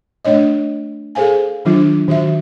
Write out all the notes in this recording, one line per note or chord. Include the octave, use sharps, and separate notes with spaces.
A3 D4 C#5 D#5
G#4 A4 C5 F5 G#5
D#3 F#3 D4 F4
D#3 F#4 E5